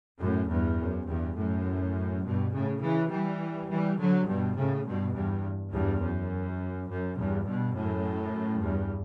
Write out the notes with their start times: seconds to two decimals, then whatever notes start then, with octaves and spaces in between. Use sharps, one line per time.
0.19 F#2 A2
0.48 E2 G2
0.78 F#2
1.06 E2 G2
1.36 F#2 A2
2.23 G2 B2
2.51 A2 C#3
2.80 C#3 E3
3.10 E3 G3
3.68 E3 G3
3.97 D3 F#3
4.26 G2 B2
4.55 A2 C#3
4.85 G2 B2
5.13 E2 G2
5.72 E2 G2
6.01 F#2
6.89 F#2
7.17 E2 G2
7.46 G2 B2
7.75 F#2 A2
8.62 E2 G2